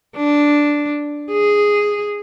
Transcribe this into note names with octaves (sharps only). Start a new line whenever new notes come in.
D4
G#4